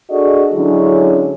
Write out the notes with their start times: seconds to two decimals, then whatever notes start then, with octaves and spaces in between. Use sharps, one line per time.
0.10 D4 F#4 G#4 A4 D5 D#5
0.52 D3 F#3 G#3 C#4 D4 E4